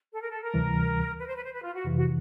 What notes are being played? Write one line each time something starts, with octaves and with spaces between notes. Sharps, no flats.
A4
A#4
A4
A#4
D2 C3 E3 G3
B4
C5
B4
C5
B4
F4
F#4
F2 C3 E3
F#4